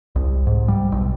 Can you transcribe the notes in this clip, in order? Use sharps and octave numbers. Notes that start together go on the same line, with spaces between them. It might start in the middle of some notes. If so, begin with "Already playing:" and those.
C2
G#2
G3
B1